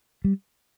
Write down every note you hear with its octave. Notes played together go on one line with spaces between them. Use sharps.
G3